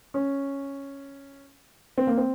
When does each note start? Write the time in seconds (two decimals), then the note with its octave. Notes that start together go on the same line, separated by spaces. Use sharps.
0.14 C#4
1.98 C4
2.07 A#3
2.17 C4